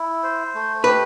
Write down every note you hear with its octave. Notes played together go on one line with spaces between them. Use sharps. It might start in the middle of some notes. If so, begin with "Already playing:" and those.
Already playing: E4
C5
A3
G4 B4